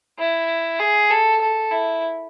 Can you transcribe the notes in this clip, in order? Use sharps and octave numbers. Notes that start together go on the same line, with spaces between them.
E4
G#4
A4
A4
E4